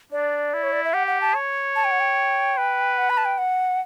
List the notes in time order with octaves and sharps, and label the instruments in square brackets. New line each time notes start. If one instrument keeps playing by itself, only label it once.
[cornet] D4 [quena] D5
[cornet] E4
[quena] C#5
D5
E5
[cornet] G4 [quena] F#5
[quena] F#5
A5
[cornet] C#5
[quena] A5
G5
F#5
G5
[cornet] B4
[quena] F#5
B5
A5
G5
F#5